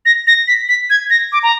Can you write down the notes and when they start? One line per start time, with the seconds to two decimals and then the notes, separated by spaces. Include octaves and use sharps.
0.06 A#6
0.27 A#6
0.48 B6
0.69 B6
0.90 G#6
1.10 A#6
1.32 D6
1.43 A#5